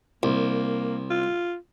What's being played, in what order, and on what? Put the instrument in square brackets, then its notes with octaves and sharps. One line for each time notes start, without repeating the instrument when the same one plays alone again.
[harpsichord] C2 [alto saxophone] A#3
[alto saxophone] F4